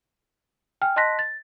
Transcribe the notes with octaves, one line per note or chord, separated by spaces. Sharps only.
G5 G#5 F6
D#5 A5 C6 F#6 A#6 B6
A6